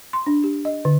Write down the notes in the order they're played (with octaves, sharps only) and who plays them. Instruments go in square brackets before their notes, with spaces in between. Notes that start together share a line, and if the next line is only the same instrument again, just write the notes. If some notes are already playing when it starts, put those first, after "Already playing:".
[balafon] C6
D4
G4
D#5
D3